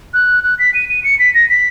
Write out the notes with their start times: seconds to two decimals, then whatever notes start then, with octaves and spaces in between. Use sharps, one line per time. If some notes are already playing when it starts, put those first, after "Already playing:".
0.14 F#6
0.44 F#6
0.59 B6
0.74 D#7
0.89 D#7
1.04 C#7
1.19 B6
1.34 A#6
1.49 B6